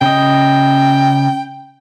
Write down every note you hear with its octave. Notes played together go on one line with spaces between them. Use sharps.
C#3 D#5 G5